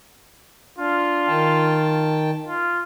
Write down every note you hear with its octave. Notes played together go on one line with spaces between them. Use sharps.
D4 F4
D#3 G5 A5
F4